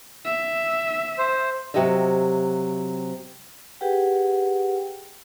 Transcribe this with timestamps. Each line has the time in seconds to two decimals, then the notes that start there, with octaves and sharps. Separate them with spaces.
0.25 E5
1.18 C5
1.74 C3 F#3 G4 D#5 E5
3.81 G4 G#4 B4 F#5 G5